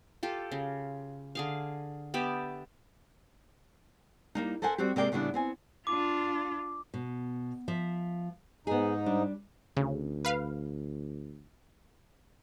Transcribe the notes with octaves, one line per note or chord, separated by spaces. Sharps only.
F4 G4 A4
C#3
D3 G#4 F5
B3 G4 D5 E5
G3 A#3 D#4
A4 A#4 C5 F#5 G#5
G3 C4 F#4 G4
C3 G#3 A#3 A#4 D5 G5
A2 C#3 G3 B3 D4
B3 C4 G#5
D4 F4 D6
B2
F3 E5
G#2 B3 D#4 G#4
G3 D4
D2 C#3
B4 F5